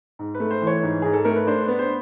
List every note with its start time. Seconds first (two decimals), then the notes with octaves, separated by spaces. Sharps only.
0.19 G#2
0.35 B4
0.40 A3
0.51 C5
0.62 E3
0.67 C#5
0.83 G#2
1.02 G#2 G#4
1.13 A4
1.25 A3 A#4
1.36 B4
1.47 D4 C5
1.63 B4
1.68 B3
1.79 C5